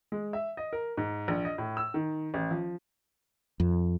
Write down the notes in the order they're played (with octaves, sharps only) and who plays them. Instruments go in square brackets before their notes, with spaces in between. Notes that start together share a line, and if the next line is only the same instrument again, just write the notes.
[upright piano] G#3
E5
D#5
A#4
G#2
A#1
D#5
A2
E6
D#3
A1
F3
[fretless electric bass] F2